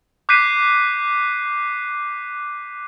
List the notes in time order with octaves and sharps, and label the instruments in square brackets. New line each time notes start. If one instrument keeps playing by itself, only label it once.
[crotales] D6 F#6 G6 B6 C7 D#7